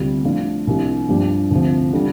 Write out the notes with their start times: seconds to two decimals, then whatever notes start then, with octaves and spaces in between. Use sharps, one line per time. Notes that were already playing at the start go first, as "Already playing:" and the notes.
Already playing: D2 C3 G3 F4
0.24 A2 F3 A3 D4 F4
0.67 C2 C3 F3 D4 G4
1.09 G2 F3 D4 G4
1.51 D2 C3 F3
1.93 D3 G3 F4